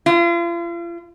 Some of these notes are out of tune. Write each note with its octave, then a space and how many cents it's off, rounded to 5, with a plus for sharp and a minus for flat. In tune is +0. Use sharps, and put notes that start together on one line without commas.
F4 -40